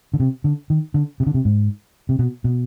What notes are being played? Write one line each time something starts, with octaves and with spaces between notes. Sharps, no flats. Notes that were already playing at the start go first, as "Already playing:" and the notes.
D3
C3
D3
D#3
D3
C3
D3
C3
G#2
C3
B2
B2